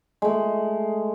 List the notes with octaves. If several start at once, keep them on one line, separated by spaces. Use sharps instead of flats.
G#3 A3